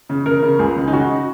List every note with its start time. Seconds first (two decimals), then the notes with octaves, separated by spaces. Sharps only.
0.09 C#3
0.26 C#3 A#4
0.42 C#3
0.59 C#2 G#4
0.76 C#3
0.88 D#4
0.93 C#3 F#4